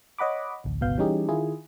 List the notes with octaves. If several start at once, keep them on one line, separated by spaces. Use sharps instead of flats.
C#5 D#5 F#5 B5 D6
A1 D2
G1 C#2 B2 B3 F5 G6
E3 G3 C#4 D#4 G4 G#4
D#3 E4 F4 G#4